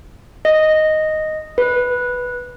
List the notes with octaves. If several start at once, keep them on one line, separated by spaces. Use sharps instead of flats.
D#5
B4